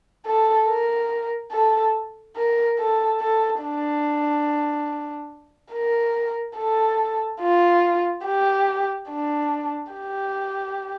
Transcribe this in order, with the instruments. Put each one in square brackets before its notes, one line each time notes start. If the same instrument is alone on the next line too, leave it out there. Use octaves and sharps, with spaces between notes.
[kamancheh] A4
A#4
A4
A#4
A4
A4
D4
A#4
A4
F4
G4
D4
G4